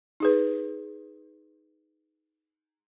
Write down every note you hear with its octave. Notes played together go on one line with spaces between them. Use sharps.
D#4 G#4 B4